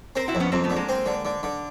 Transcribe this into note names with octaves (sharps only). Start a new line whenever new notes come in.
C4 A#4 C5
E4 F#4
F2
B3 C#4
F2 A#3 C4
A3 B3
D3
G#3 A#3
C4
D3
D3
D3